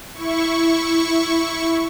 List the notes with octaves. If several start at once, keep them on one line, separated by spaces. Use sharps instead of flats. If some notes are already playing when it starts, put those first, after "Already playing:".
E4 C#6